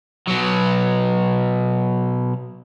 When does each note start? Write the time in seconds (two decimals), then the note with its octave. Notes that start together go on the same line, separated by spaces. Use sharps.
0.27 B2 F#3